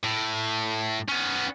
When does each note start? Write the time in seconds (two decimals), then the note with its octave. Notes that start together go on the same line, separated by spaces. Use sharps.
0.03 A2
1.09 B3 C#4